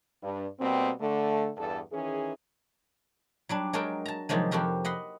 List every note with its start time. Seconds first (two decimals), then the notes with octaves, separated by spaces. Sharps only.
0.22 G2
0.59 B2 G3 A#3 C4
1.00 D3 A3
1.57 E2 G2 A4
1.92 D#3 E3 C#4 G#4
3.49 F#3 G3 D4
3.73 F#3 G#3 F#4 A#4 G5 A5
4.06 A5 A#5
4.29 C3 D#3 F3 F#3 G#3
4.51 F2 C4 F#4 G4 A#4
4.84 D#5 F#5 B5 C6